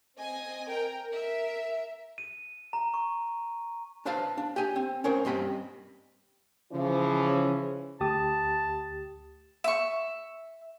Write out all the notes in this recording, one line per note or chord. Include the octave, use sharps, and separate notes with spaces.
C4 D#5 G#5
A#4 G5
A#4 E5
D#7
A#5
C#6
D4 B4 C5 F5 A5
D4
G4 G#5
C4
C#4 A#4 C5
G2 C4 D#5 B5
C#3 E3 F3 C#4
D2 G4 A5 D#6
E5 C#6